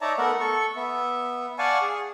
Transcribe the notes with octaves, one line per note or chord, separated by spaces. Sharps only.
D#4 C#5 D5 E5 A5 A#5
A3 B3 A#4 E5 F#5
A4 C#6
B3 E5
D5 F5 F#5 G#5 A5 C#6
G#4